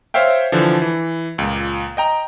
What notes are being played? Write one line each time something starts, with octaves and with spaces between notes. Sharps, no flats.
C5 C#5 E5 F5 G5
D3 E3 F3
E3
C#2 A#2
D#5 G5 A#5